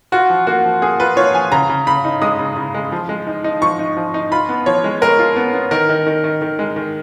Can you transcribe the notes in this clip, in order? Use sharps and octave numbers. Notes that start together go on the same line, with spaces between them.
F4 F#4
F3
A#3 F#4
F3
A#3 G#4
F4 B4
F4 C#5
F3 G#5
C#3 A#5
C#3
C#3 B5
D#4
G#3 D#6
C#3
C#3
G#3
F3
G#3
D#4
D#4
F3 C#6
D#4
F3
D#4
F4 B5
B3
F3 C#5
G#3
G#3 A#4
F4
B3
B3
D#3 A#4
D#3
D#3
D#3
D#3
G#3
D#3